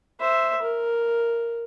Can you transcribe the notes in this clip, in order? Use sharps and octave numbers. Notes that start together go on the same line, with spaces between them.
C5 E5
A#4